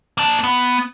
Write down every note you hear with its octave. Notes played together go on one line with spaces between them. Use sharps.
A#3 A5
B3